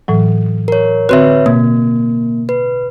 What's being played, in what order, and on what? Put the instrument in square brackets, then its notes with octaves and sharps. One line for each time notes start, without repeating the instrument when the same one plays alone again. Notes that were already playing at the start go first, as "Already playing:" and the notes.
[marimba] A2 E3 F#3
[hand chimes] A#4 C#5
[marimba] D3 C4 F#4 [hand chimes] B4 C#5 E5
[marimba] B2 [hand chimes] A#3
[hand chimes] B4